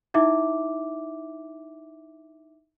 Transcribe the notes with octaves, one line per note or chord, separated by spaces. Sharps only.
D#4 E4 E5 D6